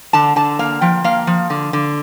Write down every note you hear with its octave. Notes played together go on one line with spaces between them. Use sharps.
D3 A5
D3 A5
A#3 F5
F3 G5
A#3 F5
F3
D3
D3